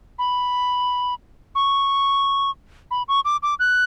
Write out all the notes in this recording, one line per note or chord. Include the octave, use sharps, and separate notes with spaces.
B5
C#6
B5
C#6
D6
D6
F#6